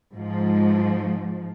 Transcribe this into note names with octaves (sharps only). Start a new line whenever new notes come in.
G#2 F3